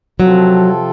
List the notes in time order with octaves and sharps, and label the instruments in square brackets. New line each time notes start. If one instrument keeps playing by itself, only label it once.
[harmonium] C3 F3 C4 F4 A4 [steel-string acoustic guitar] F#3